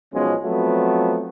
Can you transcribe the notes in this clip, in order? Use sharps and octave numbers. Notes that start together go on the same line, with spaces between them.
B1 B2 F3 G#3 C#4
F3 F#3 A3 B3 C4